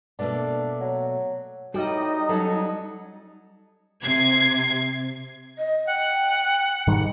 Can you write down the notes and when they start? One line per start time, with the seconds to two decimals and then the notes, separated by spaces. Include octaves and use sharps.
0.19 B2 A3 A#3 D4
0.80 F#3
1.74 A2 G3 D#4 F#4 D#5 G5
2.29 F#3 C#4 A4
4.02 C3 G#6 C7
5.59 D#5
5.87 F#5 G5
6.87 G#2 D#3 G3 D#4